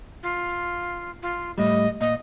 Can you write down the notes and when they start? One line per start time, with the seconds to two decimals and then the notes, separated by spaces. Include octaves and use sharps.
0.23 F4
1.23 F4
1.58 A2 G3 D#5
2.01 A#2 D#5